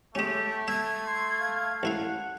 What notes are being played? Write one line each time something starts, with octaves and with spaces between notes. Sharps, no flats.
G#3 A3 C#4 G4
E5 G#6
C6
F5
A1 E4 F5 F#5